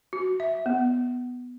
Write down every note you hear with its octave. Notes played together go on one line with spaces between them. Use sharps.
F#4
E5
B3